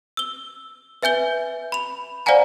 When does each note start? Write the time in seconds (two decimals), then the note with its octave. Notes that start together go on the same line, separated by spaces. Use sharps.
0.17 E6 G7
1.02 B4 E5 G#5 G6 G7
1.72 B5 F7
2.26 C5 D5 F5 F#5 G#5 A#5